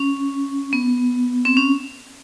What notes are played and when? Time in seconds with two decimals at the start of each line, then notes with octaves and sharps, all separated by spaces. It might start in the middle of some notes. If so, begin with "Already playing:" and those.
Already playing: C#4
0.73 B3
1.45 C4
1.57 C#4